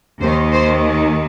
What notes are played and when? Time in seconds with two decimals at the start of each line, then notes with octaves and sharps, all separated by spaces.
0.20 D#2 D#3 C5
0.53 C5